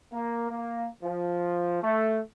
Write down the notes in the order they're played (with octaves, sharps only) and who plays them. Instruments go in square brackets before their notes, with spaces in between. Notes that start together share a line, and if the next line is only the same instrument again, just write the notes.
[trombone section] A#3
A#3
F3
A3